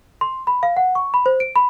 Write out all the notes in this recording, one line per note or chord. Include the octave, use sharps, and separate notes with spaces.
C6
B5
F5
F#5
C#6
B5
C5
D7
B5